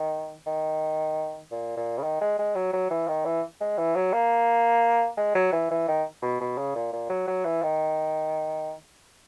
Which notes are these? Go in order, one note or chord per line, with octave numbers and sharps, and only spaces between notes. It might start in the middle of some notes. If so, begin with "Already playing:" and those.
Already playing: D#3
D#3
A#2
A#2
C#3
D#3
G#3
G#3
F#3
F#3
E3
D#3
E3
G#3
E3
F#3
A#3
G#3
F#3
E3
E3
D#3
B2
B2
C#3
A#2
A#2
F#3
F#3
E3
D#3